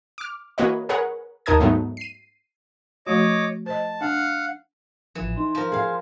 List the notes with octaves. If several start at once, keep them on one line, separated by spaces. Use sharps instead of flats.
D6 F6
E3 A#3 F#4 B4 C#5 D#5
G#4 A#4 B4 C#5 F#5
D#2 D#4 A#4 A5 D#6 G#6
G#2 F#3 A3 B3 D#4
C7 D#7
F3 A3 F#4 C#5 D#5 D6
C5 D#5 A5
D4 F5 F#5
A1 E3 F3
D#4 C6
F3 A#4
G#4 F5